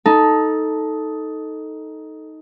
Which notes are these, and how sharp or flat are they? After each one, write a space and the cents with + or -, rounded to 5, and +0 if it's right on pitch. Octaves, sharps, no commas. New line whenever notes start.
D#4 +10 A4 +0